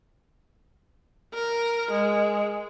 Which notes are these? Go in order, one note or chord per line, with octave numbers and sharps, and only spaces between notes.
A#4
G#3